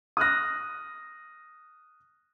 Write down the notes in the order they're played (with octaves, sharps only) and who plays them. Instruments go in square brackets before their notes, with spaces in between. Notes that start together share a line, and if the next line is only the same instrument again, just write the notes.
[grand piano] D#6 F6 F#6 A#6